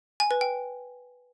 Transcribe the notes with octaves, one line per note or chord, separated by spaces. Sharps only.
G#5
B4
G5